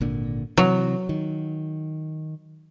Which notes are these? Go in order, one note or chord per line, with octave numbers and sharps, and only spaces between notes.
G#1 A#2 D3
C3 E3 F#3
D#3